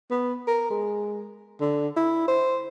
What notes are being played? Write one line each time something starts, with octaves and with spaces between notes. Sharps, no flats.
B3
A#4
G#3
D3
E4
C5